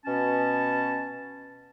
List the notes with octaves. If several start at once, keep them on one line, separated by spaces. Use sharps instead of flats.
B2 C#4 A5